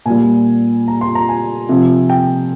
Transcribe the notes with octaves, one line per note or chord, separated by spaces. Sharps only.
A#2 G3 G#5
A#5
C6
A#5
G#5
C3 F3
G5